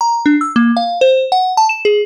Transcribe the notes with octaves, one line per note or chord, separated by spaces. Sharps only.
A#5
D4
E6
A#3
F5
C5
F#5
A5
E7
G#4